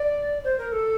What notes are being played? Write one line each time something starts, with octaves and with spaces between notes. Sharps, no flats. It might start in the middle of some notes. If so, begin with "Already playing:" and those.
Already playing: D5
C5
A#4
A4